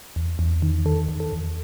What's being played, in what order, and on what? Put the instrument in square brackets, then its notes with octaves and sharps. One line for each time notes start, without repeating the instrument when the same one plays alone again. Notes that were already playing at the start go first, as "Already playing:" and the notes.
[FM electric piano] E2
E2
D#3
D#3 A4
E2
A4
E2